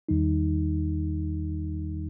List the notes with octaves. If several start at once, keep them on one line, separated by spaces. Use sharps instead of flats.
E2 D#3 G3 D#4